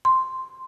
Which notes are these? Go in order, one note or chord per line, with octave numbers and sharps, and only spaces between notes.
C6